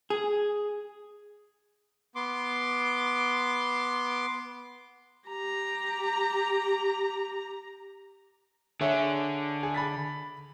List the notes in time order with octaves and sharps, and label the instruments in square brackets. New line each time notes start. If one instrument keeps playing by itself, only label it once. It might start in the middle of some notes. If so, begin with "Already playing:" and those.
[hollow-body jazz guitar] G#4
[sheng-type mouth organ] B3 C6 D6
[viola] G4 A#5
[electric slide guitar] D3 [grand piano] G#4 C#5 E5
[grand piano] G#4
B5 A6 B6